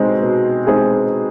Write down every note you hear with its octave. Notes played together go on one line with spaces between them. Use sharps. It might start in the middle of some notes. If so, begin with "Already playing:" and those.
Already playing: B2 G#3 C4 D#4 G#4
B2
G#3 C4 D#4 G#4